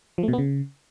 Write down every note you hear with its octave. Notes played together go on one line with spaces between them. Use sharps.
F3
A3
B2
B3
C#3